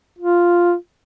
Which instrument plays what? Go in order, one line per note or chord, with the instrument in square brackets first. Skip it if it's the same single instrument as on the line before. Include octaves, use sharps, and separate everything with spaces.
[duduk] F4